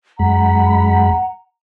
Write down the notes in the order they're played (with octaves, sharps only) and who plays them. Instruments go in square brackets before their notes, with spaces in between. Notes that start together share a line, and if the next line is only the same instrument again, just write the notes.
[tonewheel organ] F#2 G#3 B5 [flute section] F#5 A#5